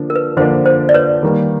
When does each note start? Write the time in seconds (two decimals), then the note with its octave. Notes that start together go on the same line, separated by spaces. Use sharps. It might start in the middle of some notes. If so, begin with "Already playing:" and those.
Already playing: D3 F3 A#3 D4
0.10 A#4
0.16 B4
0.37 D3 F3 A#3 D4 C5
0.65 C5
0.89 D5
0.94 B4 C#5
1.23 D#3 G3 A#3